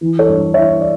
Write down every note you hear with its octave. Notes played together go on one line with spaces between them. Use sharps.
E3
A4 C#5
G2
E3 C#5 E5
D5